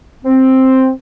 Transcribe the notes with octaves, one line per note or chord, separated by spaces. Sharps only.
C4